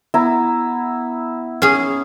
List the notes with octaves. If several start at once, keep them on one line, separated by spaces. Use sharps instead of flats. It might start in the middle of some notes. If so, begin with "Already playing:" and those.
B3 E4 A#5
C#4 G#4